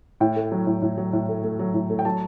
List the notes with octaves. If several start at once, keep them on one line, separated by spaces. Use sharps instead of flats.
A2 G5
A3
F#3
A2
A2
F#3
A2
A3
A3
F#3
A2
A3
G5
F#3 A5